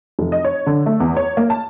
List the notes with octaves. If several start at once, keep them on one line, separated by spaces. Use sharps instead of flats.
F1
D#5
C#5
D3
A3
E2
C#5
A#3
A5